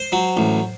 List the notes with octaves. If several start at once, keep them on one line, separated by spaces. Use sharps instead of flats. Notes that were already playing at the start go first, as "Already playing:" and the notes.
Already playing: C5
F#3
A1